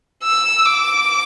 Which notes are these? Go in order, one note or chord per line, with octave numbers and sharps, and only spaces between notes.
E6
D6